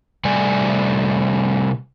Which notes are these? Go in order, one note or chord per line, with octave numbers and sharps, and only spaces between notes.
C3 G3 A3 D5 G#5